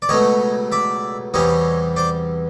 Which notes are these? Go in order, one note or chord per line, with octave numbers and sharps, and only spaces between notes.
D5
C#2 B2 F#3 A3 C#5 D#5
D5 E5
E2 C3 E3 G3 C#5 D#5
C5 D5